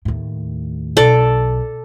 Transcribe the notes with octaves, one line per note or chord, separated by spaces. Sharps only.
D#2 A2
B1 A4 D5